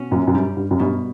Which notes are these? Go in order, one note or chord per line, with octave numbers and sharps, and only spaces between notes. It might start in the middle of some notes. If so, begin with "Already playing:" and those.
Already playing: B2 C#4
F#2 A#2
F#2
G2 G3
G2
F#2
G2 B2